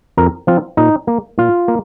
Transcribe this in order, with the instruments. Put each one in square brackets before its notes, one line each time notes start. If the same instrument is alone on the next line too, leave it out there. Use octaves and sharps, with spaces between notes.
[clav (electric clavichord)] F2 A#4
F3 C4 F4
A#2 D#4
A#3
A#2 F4
A#3